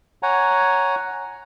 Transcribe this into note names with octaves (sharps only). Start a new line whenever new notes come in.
C#5 F#5 G#5 A#5